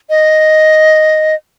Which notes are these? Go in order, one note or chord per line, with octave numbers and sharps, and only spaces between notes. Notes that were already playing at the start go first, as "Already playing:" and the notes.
D#5